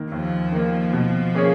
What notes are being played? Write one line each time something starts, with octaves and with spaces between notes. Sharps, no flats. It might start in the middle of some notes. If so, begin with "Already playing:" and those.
Already playing: D#2 D#3 A#3
D#2 F3
D#3 A#3
B2
A#3 C#4 G#4 C#5